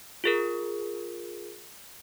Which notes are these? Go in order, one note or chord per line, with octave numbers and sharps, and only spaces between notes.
F4 G#4 A#4